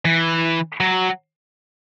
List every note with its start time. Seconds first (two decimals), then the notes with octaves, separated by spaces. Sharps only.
0.05 E3
0.80 F#3